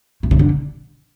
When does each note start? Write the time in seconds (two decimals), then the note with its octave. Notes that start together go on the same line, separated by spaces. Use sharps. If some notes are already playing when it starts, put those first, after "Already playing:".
0.23 A2
0.31 C3
0.39 D3